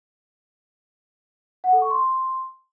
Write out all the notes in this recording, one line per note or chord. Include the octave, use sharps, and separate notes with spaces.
F#5
A4
C#6
C6